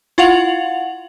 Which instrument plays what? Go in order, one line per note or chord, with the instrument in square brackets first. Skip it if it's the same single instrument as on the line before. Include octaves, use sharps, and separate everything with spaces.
[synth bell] E4 F4 F5 F#5 F7 F#7